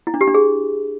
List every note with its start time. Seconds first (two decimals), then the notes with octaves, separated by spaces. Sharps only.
0.07 E4
0.14 D4
0.21 G4
0.28 D4
0.35 G#4